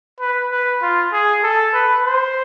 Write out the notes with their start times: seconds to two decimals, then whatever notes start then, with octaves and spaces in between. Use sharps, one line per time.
0.20 B4
0.52 B4
0.82 F4
1.13 G#4
1.43 A4
1.74 B4
2.04 C5